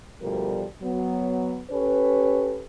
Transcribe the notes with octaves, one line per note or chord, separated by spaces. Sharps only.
D2 B2 D3 F3 G3 A#4
F#3 B3
C#4 G4 A4 B4